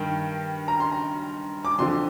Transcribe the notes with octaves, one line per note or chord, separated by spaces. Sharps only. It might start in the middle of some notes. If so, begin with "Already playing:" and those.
Already playing: G2 D#3 G5
A#5
C6
A#5
D6
F2 D3 F3 C6